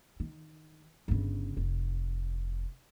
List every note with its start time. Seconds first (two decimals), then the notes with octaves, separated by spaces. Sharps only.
0.20 D#3
1.08 G1 C#3
1.57 F1